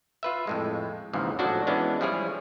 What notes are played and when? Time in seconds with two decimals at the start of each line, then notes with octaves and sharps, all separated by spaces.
0.23 F4 B4 E5
0.47 F2 A2 G#3
1.13 D#2 G#2 C#3 E3 F3
1.39 A2 F3 F#3 D4 F#4
1.67 E3 G#3 B3 C#4 D4
2.01 F3 G3 E4 G#4 C#5